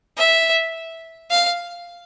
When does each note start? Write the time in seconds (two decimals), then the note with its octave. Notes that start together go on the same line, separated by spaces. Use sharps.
0.18 E5
1.31 F5